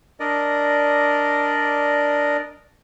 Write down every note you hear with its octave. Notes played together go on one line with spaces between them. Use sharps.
D4 A#4 D5 D#5